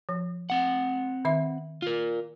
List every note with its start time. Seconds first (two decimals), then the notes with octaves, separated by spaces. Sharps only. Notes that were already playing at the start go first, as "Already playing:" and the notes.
0.09 F3
0.50 C4 F#5
1.25 D#3 E5
1.82 F4 A#4